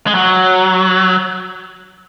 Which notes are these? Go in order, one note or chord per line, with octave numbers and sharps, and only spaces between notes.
G#3
F#3